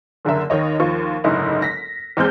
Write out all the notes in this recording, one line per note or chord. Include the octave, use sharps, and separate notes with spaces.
F#1 D3 A#4 E5
D#2 D#3 C#5 D#5
D#2 F3 F4 C#6
F#1 D2 G#2 E4 D#5
A#6 B6
E2 G#3 C4 F6 G6